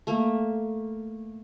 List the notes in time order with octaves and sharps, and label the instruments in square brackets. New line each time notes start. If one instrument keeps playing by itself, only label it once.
[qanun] A3 A#3